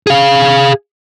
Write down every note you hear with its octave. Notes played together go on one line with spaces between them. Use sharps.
G#4 F5